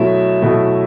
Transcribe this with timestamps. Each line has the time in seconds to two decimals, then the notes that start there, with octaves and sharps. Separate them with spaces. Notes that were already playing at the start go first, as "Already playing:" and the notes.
Already playing: B2 F#3 A3 E4 E5
0.42 B2 F#3 A3 E4